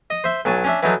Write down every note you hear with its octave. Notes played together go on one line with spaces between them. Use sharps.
D#5
C5 E5
B1 F#3 G#5 A5
C#4 D4 E5
E3 F#3 D#4 A4